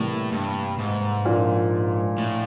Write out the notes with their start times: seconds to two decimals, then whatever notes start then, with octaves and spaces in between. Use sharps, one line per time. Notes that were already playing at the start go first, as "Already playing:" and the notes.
Already playing: A2 C3 E3 G3 A#3
0.33 G2
0.79 G#2
1.25 A#2 F3 A#3 D4
2.18 A2